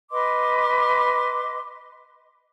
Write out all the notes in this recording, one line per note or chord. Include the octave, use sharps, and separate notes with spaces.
B4 D#5 C6 D6